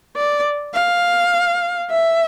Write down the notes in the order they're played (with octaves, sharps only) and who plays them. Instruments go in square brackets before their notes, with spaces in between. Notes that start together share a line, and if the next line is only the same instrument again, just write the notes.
[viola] D5
F5
E5